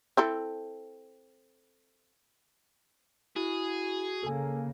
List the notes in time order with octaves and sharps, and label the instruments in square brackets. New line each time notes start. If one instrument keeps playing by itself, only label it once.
[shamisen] C4 E4 A4
[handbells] E4 [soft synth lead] F#4 [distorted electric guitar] G#4
[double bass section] C#3 A#3 [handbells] A4 G#5